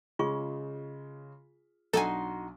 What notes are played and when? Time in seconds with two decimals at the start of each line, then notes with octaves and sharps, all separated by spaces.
0.19 C#3 G#3 F4 G#4 C#6
1.93 B1 D4 D#4 F#4 A4 G#5 C6